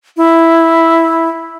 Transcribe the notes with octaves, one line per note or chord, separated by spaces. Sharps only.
E4